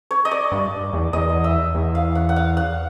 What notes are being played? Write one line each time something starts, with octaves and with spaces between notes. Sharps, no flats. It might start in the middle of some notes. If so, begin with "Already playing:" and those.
C#5
D#5
D5
G2
E2
E2 D#5
E5
E2
F5
F#5
F#5
F5
F#5